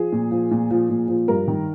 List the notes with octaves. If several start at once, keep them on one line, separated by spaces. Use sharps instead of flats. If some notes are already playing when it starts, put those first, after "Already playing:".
Already playing: F3 G#4
A#2
F3
A#2
F3
A#2
F3
G2 A#4
D#3